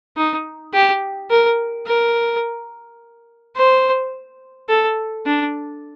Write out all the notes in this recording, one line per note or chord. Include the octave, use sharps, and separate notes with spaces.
D#4
G4
A#4
A#4
C5
A4
D4